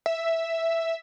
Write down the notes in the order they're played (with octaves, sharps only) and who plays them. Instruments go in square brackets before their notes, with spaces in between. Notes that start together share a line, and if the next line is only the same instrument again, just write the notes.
[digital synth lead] E5